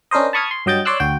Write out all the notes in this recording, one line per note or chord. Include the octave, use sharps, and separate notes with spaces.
C#4 D4 A#4 C5 D#5
A5 B5 C#6 D#6 F6 G#6
C6
G2 F#3 D#5 G5 G6 A6
C#5 D5 C6 D6 E6 F#6
D2 F#4 G5